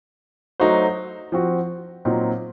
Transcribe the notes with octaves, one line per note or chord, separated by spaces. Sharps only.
F#3 A3 D#4 F#4 C5
F3 C4 F#4
A#2 F#3 C4 D#4